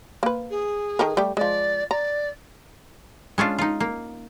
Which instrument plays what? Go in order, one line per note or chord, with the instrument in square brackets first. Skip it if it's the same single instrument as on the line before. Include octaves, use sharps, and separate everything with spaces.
[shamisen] A#3 B4
[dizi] G#4
[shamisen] D#3 A4 A#4
G3 A3 G4
[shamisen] F3 G#3 [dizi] D5
[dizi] D5 [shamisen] A#5
[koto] G#3 C#4 D4 F4
D#4 F4
A#3